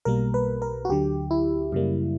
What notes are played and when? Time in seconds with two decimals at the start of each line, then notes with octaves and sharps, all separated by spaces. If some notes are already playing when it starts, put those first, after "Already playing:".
0.05 B1 B2 G3 A#3 A#4
0.34 B4
0.62 A#4
0.85 F#4
0.89 D2 D3 F#3 G4
1.31 E4
1.72 F#2 C#3 G3 A#3